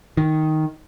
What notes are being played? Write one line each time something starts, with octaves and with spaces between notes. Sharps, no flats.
D#3